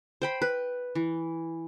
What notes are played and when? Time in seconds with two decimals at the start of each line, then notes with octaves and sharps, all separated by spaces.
0.22 C5 G5 B5
0.42 B4
0.95 E3